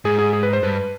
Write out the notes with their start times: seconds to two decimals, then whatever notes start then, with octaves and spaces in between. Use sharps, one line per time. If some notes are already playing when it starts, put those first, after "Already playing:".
0.05 G#2 G#4
0.19 G#4
0.33 G#4
0.43 B4
0.53 C5
0.63 G2 B4